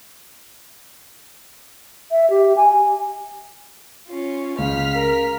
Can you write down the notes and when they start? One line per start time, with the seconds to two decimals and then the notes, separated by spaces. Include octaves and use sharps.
2.11 E5
2.30 G4
2.57 G#5
4.07 C#4 F4
4.58 C#2 F5 F6 B6
4.95 A#4